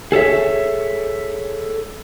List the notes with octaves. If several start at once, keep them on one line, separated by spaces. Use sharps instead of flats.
G#4 A4 C#5 E5